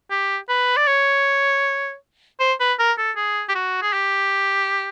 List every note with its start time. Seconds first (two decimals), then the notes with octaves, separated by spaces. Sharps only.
0.11 G4
0.49 B4
0.77 D5
0.87 C#5
2.40 C5
2.60 B4
2.79 A#4
2.98 A4
3.16 G#4
3.49 G4
3.55 F#4
3.82 G#4
3.93 G4